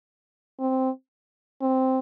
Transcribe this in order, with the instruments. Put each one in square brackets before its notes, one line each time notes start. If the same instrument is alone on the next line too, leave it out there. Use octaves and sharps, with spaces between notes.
[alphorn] C4
C4